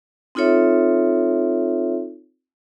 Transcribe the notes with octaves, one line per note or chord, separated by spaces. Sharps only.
C4 D#4 F4 A4 C#5 E5